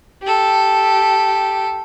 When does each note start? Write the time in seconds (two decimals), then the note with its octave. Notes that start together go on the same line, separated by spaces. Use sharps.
0.23 G4 A4